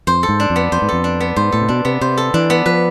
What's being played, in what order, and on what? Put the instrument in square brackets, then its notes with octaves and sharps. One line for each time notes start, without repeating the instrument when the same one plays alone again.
[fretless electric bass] F2 [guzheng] C5
[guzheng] A4
[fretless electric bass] G#2
[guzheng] D4
[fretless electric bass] F2
[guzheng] B3
[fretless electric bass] F2 [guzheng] C5
[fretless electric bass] G#2
[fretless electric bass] F2 [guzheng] A4
[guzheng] D4
B3
[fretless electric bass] G#2 [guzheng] C5
[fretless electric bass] A2 [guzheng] A4
[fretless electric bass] C3
[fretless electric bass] B2 [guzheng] D4
[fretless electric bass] C3 [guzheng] B3
[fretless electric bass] C3 [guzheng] C5
[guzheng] A4
[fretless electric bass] E3 [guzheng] D4
[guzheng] B3
[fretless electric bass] F3 [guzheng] B4